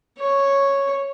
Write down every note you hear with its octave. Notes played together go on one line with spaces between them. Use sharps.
C#5